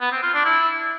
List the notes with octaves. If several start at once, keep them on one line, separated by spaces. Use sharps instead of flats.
B3
C4
F4
D4
E4